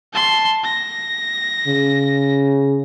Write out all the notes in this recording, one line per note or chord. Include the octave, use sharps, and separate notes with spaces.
A5 C6
A#6
C#3